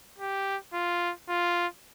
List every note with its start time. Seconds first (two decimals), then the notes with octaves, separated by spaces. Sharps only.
0.19 G4
0.73 F4
1.28 F4